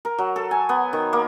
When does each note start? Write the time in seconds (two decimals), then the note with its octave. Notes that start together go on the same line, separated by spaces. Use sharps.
0.05 A#4
0.18 F#3
0.36 A4
0.51 G#5
0.69 B3
0.93 D#3
1.13 A#3